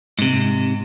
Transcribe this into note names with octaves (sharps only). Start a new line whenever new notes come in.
G#2 C3